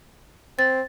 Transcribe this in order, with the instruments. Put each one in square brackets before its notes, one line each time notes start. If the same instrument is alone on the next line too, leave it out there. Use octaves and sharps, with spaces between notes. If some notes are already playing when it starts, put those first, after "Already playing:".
[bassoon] C4 [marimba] A6